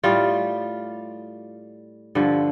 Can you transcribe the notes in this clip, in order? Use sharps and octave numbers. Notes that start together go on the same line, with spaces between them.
A2 G3 F4
G2 D3 F3